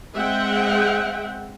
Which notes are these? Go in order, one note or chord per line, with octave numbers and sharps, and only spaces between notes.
G#3 C4 E5 F#5 G5